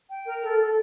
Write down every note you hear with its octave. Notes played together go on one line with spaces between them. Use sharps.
G5
A#4
A4
A4